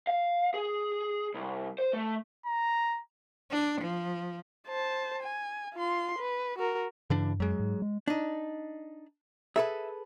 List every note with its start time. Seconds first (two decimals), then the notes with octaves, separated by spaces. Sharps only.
0.07 F5
0.54 G#4
1.34 C2
1.79 C5
1.93 A3
2.46 A#5
3.51 D4
3.82 F3
4.68 C5 A5
5.22 G#5
5.74 F4 C6
6.18 B4
6.58 F#4 A#4
7.10 G2 C#3 E3 D4
7.40 F#2 F#3 G#3
7.60 G#2
7.82 G#3
8.08 D4 D#4
9.56 G#4 A4 B4 E5